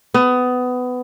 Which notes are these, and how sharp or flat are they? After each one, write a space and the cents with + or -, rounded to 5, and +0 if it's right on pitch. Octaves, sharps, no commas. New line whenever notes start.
B3 +20